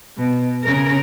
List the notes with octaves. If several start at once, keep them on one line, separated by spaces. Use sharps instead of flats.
B2
C#3 A#4